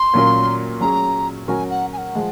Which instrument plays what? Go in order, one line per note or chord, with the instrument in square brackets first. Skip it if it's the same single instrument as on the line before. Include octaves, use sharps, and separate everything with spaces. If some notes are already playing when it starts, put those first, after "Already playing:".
Already playing: [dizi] C6
[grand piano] A#2 F#3 C#4 F4 A#4
[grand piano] F#3 C#4 G#4 [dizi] A#5
[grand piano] F#3 C#4 F#4 A#4 [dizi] G#5
[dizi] F#5
G#5
F#5
[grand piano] F3 G#3